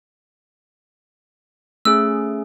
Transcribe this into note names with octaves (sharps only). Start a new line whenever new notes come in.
A3 C#4 G#4 E6